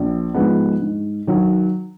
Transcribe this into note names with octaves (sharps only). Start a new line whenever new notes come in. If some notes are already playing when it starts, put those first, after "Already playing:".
Already playing: A#1
G#2 F3 G#3 B3
G#2
D#3 F#3